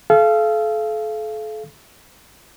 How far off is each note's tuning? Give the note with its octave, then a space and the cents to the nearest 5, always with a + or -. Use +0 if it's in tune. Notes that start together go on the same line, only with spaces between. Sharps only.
A4 -35 F5 -30